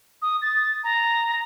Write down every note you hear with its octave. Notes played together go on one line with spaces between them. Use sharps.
D#6
A6
A#5